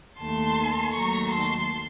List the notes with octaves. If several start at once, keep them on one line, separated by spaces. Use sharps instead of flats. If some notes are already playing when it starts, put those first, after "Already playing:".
D#2 D#3 A3 A5 C6
D#2 D#3 F#3 A3 A#5 C#6
A5 C6